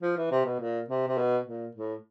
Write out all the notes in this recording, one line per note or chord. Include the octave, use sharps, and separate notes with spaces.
F3
E3
C3
B2
A#2
C3
C3
B2
A#2
A2